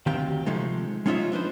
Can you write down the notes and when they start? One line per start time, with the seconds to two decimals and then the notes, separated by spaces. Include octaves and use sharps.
0.06 D2 D#3 C4 G4 F5 G5
0.46 C3 F3 G#3 A3 D#4
1.06 G#3 C#4 D#4 F4 C5 E5
1.32 F3 D4 B4 C5